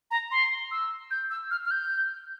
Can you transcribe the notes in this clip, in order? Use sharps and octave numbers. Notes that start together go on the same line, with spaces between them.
A#5
C6
E6
G6
E6
F6
F6
G6